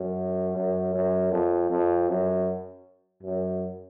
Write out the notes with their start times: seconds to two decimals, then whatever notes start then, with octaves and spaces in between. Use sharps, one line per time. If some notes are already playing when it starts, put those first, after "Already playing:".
Already playing: F#2
0.56 F#2
0.95 F#2
1.32 F2
1.70 F2
2.09 F#2
3.23 F#2